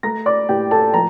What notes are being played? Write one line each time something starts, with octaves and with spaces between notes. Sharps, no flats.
A3 A#5 A#6
D5 D6
A2 G4 G5
A4 A5
F3 A#5